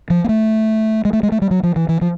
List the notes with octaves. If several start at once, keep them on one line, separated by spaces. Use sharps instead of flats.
F3
A#3
A3
G#3
A3
G#3
A3
G3
F#3
F3
E3
E3
F3